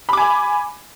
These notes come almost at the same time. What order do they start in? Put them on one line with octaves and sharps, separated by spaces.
B5 D6 G#5